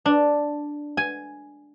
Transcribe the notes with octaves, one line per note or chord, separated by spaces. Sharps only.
D4
G#5